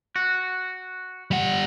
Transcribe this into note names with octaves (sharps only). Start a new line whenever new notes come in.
F#4
G3 F#5